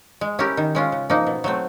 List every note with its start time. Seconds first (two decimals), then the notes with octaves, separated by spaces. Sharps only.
0.21 G#3
0.39 C#4 E4 G4 A#4
0.57 D#3
0.75 G#3 C#4 F4
0.92 C#3
1.10 F3 A#3 D#4
1.27 B2
1.44 F#3 A3 C4